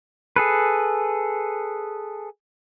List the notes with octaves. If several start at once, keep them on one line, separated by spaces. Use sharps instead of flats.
G#4 A4 B4